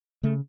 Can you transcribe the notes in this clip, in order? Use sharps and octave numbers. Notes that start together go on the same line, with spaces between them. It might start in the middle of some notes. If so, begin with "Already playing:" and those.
C#3 A3